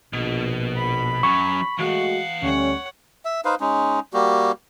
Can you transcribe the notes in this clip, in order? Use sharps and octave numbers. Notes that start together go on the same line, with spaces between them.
A#1 B2
B5
F#3 C#4 C#6
E3 G#3 A3 F#4 F5 F#5
D2 G3 A3 C#4 C#5 F#5
E5
D#4 B4 C5 F5
G#3 C#4 D#4
G3 A#3 F#4 G4